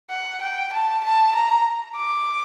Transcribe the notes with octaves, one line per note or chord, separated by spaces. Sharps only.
F#5
G5
A5
A5
A#5
D6